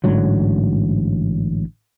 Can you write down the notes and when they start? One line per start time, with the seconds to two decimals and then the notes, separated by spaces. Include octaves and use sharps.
0.04 A1 G#2 D3 F#3